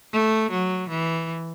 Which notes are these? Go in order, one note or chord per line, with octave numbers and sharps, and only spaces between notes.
A3
F#3
E3